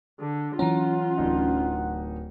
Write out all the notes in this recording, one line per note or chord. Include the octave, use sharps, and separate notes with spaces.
D3
E3 F#3 C#4 F4 F#5 A#5
D1 D4 D#4